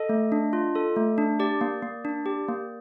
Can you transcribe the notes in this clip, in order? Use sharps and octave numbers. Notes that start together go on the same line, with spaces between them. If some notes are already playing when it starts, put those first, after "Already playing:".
Already playing: A4 D#5
A3
D4
F4
A4
A3
D4
G4 D5
A#3
A#3
D4
G4
A#3